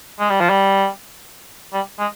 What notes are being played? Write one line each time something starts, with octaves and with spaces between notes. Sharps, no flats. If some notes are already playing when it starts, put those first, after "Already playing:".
G#3
G3
F3
G3
G3
G#3